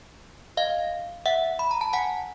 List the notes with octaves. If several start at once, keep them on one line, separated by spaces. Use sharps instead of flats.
D#5 F5
E5 F#5
B5
A#5
A5
F#5 G#5